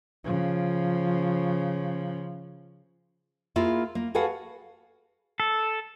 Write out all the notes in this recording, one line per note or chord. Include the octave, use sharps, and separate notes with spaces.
C#3 F3
A#3 E4 F4 G#4
A#3
F#4 G#4 A4 B4 F5 F#5
A4